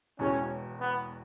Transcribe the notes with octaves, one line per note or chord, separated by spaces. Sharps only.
E1 E2 B2 G#3 C#4
B3